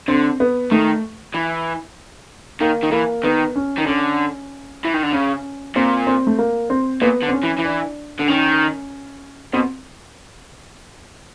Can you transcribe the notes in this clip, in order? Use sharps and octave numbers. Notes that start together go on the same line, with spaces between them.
D3 C4
B3
D#3 A3
E3
D#3 A#3
D#3
E3 A#3
D#3 B3
C#4
D#3
D3 C#4
E3
D#3
D3
C#3 C#4
A#2 C4
C4
A3
A#3
C4
A#2 B3
D3
C4
C#4
E3
E3
D4
D3
D#3 C#4
B2 C4